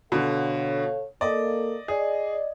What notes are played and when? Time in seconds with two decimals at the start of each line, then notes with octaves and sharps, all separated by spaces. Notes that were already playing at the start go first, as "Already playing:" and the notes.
0.12 B2 D3 A4 C#5 F5
1.21 A#3 A4 D5 D#5
1.88 G#4 D5 D#5